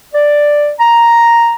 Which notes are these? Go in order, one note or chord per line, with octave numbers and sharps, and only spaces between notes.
D5
A#5